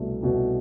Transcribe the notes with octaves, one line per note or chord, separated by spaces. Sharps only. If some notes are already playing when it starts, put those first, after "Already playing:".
Already playing: C2 B2 A3
C2 B2